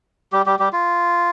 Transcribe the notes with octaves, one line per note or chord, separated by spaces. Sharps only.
G3 G4
G3 G4
G3 G4
F4